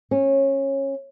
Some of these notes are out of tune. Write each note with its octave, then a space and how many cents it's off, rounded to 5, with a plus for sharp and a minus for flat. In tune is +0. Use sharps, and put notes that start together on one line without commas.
C#4 -20